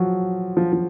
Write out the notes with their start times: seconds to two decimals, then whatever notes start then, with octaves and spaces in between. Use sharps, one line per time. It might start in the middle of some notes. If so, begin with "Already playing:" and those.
Already playing: F3 F#3
0.57 F3
0.73 F3